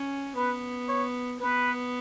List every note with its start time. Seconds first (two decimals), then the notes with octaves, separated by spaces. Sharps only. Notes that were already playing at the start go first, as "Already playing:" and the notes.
Already playing: C#4
0.36 B3 B4
0.88 C#5
1.40 B3 B4